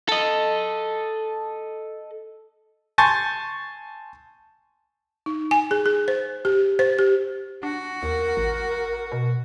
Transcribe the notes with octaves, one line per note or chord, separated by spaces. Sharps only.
A4 D#5
G#5 A5 C6 C#6 G6 A6
D#4
G#5
G#4
G#4
C5
G4
C5
G4
D4 F#4
D#2 A#4
A1
B2